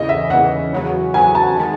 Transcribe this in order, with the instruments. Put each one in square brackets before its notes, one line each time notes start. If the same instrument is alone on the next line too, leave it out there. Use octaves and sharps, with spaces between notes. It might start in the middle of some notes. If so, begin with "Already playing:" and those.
Already playing: [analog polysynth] E2 C#3 E3 [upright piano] D#5
[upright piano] E5
[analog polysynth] E2 C#3 E3 [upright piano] F#5
[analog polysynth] E2 C#3 F#3 B3
[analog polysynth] E2 C#3 F#3 B3 [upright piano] G#5
[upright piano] A5
[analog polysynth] D#3 G#3 B3